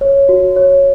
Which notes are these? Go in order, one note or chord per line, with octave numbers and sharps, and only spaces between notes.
C#5
F#4
C#5